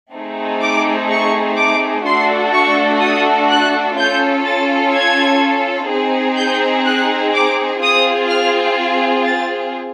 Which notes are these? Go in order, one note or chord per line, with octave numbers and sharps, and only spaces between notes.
A3 C4 D#4 G#4
D6
C#6
D6
A3 D4 F#4 A4 C6
C#6
D#6
F#6
C#4 F4 A4 G6
A6
G#6
C4 D#4 G#4
G6
F#6
D6
C4 F4 G#4 D#6
F6
A6